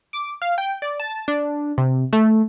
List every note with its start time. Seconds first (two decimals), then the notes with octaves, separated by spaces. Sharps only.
0.13 D6
0.42 F5
0.58 G5
0.82 D5
1.00 A5
1.28 D4
1.78 C3
2.13 A3